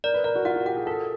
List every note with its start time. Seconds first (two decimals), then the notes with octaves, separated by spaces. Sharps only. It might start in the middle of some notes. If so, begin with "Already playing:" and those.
0.04 A#4 D5
0.14 B4
0.24 A#4 D5
0.35 F#4
0.45 F4 F#5
0.56 F#4
0.66 G4 F#5
0.76 G#4
0.87 A4 A#4